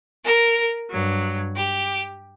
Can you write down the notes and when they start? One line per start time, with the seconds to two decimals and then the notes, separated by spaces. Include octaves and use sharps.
0.23 A#4
0.89 G2 F#3
1.55 G4